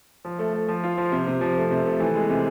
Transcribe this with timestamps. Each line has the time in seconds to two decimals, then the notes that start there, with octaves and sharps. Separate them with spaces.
0.25 F3
0.39 A3
0.53 A3
0.68 F3
0.83 F4
0.98 F3
1.12 C3
1.27 C3
1.41 F3
1.57 A3
1.71 C3
1.86 A3
2.00 E3
2.15 G#3
2.30 C3